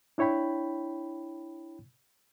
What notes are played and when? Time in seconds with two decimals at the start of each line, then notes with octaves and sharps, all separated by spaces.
0.18 D4 E4 C#5 G5 B5